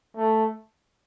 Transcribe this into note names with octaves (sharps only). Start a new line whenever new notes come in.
A3